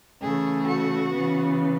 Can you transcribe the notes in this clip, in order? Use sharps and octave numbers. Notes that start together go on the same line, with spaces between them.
C#3 E3 A3 G#4
F#4
C#3 E3 B3